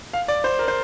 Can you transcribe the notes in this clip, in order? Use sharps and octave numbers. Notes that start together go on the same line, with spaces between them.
F5
D5
C5
A#4
C5